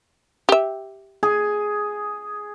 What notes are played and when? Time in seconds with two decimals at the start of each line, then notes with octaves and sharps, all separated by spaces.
0.49 G4 E5
1.23 G#4